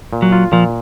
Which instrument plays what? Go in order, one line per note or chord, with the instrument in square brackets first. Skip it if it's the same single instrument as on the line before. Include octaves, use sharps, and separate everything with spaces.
[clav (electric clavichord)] A#2
[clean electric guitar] F#3
[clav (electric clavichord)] F4
[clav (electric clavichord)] A#2 [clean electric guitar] F3